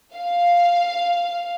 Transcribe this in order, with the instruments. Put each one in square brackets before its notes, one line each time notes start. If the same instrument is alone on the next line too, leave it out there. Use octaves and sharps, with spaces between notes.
[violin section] F5